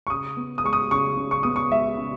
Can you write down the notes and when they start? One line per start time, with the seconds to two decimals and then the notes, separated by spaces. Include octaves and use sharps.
0.07 C#6
0.10 C#3 D#6
0.37 B3
0.58 D#6
0.64 G#3 C#6
0.73 D#6
0.91 C#3 C#6
1.17 C#3
1.31 C#6
1.43 B3 D#6
1.56 C#6
1.71 G#3 E5
1.98 C#3